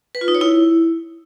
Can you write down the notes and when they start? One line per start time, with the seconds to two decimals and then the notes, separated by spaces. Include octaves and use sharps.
0.15 B4
0.21 F4
0.28 D#4
0.35 C#5
0.41 E4